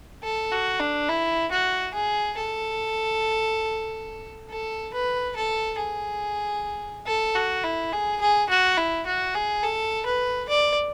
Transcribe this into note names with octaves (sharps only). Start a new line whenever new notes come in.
A4
F#4
D4
E4
F#4
G#4
A4
A4
B4
A4
G#4
A4
F#4
E4
G#4
G#4
F#4
E4
F#4
G#4
A4
B4
D5